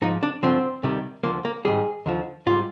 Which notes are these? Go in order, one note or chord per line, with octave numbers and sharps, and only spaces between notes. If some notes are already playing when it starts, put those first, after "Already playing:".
G#2 F3 D#4
D4
G2 D3 F3 C4
D2 C3 D#3 G3
D2 D3 F3 A#3
A#3
G#2 D#3 G3 G#4
D#2 D3 F3
G#2 G3 F4